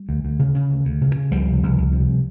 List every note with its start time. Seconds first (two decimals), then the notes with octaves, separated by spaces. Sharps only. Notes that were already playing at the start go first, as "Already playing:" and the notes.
Already playing: G3
0.09 D2
0.25 D2
0.39 C#3
0.55 C#3
0.70 D2
0.85 D2
1.01 C#3
1.16 C#3
1.31 C#2 F3 G3
1.47 C3
1.63 C#2
1.78 C#2
1.93 C3